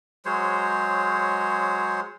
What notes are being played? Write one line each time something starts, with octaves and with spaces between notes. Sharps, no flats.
F#3 G#3 C5 C#5